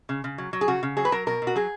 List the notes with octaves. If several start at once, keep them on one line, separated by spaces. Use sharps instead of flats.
C#3
C#3
F#3
F#3
G#4
C#3 F#4
C#3
F#3 G#4
B4
F#3 A#4
B2 A#4
B2
F#4
F#3 G#4